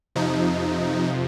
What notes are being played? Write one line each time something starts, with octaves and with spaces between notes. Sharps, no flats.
F2 C3 F3 D#4